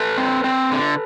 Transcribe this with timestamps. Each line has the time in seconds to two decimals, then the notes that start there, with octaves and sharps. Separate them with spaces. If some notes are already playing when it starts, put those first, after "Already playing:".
Already playing: A4 B4
0.18 C4
0.44 C4
0.71 D3